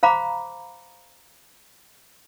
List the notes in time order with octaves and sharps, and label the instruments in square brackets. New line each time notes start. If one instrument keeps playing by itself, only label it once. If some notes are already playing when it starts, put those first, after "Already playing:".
[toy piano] C5 F5 A#5 B5 D6